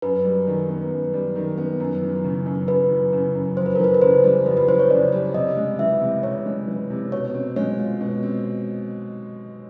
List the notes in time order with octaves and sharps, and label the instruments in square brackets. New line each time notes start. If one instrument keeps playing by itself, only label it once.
[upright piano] F#2 [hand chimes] B4
[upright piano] G3
D#3
B3
F#2
G3
D#3
B3
F#2
E3
C#3
F#2
[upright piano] F#2 [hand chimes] B4
[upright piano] E3
C#3
F#2
[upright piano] F2 [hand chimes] C5
[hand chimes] B4
A#4
[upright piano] E3 [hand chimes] B4
[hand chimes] B4
[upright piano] C#3 [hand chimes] C5
[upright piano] G3
[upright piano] F2 [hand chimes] B4
[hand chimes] B4
[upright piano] E3 [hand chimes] C5
[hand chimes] C#5
[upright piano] C#3 [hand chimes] D5
[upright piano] G3
[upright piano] C3 [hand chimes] D#5
[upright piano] G#3
[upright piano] E3 [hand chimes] E5
[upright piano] C3
[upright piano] C3 [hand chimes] C#5
[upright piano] G#3
E3
C3
[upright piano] B2 [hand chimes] C#5
[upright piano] C4
[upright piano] G#3 [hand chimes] C#5
[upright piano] F4
B2
C4